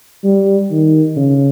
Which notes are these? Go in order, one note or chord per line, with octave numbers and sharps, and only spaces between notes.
G3
D#3
C#3